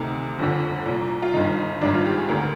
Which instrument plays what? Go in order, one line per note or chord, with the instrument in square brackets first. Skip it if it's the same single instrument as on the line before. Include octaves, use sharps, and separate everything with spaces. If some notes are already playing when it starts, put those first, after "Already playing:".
Already playing: [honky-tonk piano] D2 C3 D#3
G1 F2 D3
C2 A#2
F4
G1 G2 D#3 D#4
G#1 G2 D#3 D4
F4
G4
G#4
D2 D3 A#4